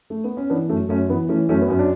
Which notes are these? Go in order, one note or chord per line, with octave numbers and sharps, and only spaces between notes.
A3
B3
C#4
E3 B3 D4
F#2 A3 C#4
F#2 A3 C#4
E3 B3
E3 A3 C#4
F#2 A3 C#4
B3
F#2 C#4
D4